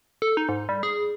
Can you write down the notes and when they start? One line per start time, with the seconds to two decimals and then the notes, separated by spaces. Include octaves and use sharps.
0.22 A4
0.37 D#4
0.49 G#2
0.69 G3
0.83 G#4